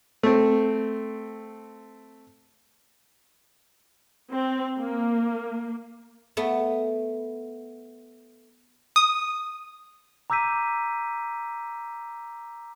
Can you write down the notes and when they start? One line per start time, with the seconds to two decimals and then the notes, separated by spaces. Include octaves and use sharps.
0.23 A3 C4
4.33 C4
4.78 A#3
6.37 A3 B3
8.96 D#6
10.30 A#5 D6 E6 G6 B6 D#7